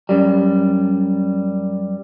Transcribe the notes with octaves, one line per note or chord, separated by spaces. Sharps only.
F#2 G3